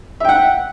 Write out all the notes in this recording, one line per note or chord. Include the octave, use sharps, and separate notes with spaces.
E5 F#5 G5